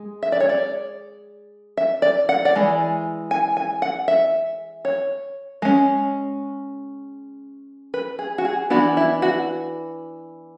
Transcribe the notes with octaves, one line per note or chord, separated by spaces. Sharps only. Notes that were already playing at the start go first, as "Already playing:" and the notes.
Already playing: G#3
E5
D5
C#5
D5
E5
D5
F#5
D5
E3 G#3
G#5
G#5
F#5
E5
C#5
G#3 C#4
B4
G#4
F#4
G#4
E3 B3 D4 F#4
E4
F#4